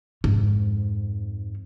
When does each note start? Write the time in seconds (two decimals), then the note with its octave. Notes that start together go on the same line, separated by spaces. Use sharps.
0.24 F2 G#2